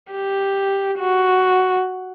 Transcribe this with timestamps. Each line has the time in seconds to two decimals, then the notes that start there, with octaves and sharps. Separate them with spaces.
0.12 G4
0.99 F#4